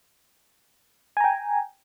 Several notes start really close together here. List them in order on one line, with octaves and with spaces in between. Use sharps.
G#5 A#5 G5